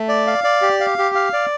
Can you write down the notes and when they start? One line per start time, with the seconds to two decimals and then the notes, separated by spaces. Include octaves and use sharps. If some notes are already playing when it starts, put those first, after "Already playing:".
Already playing: A3
0.09 D5
0.27 F5
0.44 D5
0.62 G4
0.80 F5
0.98 G4
1.15 F5
1.33 D5